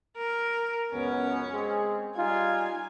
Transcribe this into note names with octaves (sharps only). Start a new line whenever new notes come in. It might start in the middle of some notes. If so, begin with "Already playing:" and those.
A#4
C#2 F#2 B3 C#4
G#3 C4 G#4
G3 D#4 F4 G#5